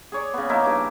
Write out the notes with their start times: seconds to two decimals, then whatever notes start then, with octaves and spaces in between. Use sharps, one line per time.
0.12 G#4 C#5 D5
0.34 C#3 B3
0.49 F3 A#3 D#4 E4
0.64 G2 D6